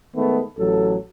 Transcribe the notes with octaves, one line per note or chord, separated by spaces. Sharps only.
D#3 G#3 A3 B3
A1 F#3 A4